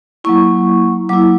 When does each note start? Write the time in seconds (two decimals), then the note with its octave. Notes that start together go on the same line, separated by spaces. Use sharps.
0.24 F#3 A#3 E4 C#6
1.09 F#3 A#3 E4 D6